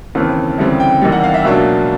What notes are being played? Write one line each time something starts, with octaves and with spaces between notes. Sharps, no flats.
D#2 C#3 E3 A3 C4
D2 C#3 E3 G3 C4
G5
E2 C3 D#3 G3
F#5
F5
E5
C#2 B2 F#3 A#3 D4 E5